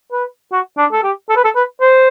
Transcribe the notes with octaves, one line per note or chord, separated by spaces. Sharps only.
B4
F#4
D4
A4
G4
A4
B4
A4
B4
C5